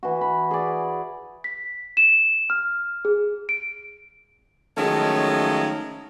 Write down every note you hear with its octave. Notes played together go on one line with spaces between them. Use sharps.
E3 F#4
B5
G#4 D5
B6
E7
F6
G#4
D7
D#3 F3 F#3 G#3 A3 C#4